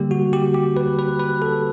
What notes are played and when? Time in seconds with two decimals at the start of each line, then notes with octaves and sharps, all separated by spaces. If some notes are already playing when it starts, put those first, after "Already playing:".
Already playing: D3 G3 A#3 G4
0.11 F#4
0.33 G4
0.54 G4
0.77 B4
0.99 B4
1.19 B4
1.42 A4